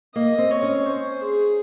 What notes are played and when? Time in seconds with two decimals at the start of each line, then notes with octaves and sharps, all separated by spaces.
0.15 A#3 D#5
0.38 C4
0.51 C#5
0.62 C#4
0.86 C5
1.21 G#4